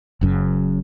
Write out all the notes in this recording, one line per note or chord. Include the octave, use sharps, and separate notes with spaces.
F#1 F#2 C#3